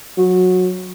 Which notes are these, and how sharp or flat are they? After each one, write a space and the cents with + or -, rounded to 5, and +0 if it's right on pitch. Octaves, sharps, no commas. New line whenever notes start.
F#3 -15